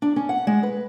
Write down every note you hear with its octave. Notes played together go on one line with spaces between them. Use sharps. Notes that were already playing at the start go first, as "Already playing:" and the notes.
D4
C#4
F#5
G#3
B4